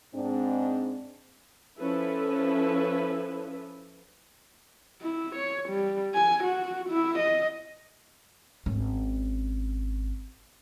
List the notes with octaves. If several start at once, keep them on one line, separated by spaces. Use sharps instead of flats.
G#2 C4 D4
F3 C#4 E4 A4 B4 E5
E4
C#5
G3
G#5
F#4
E4
D#5
G#1 C#4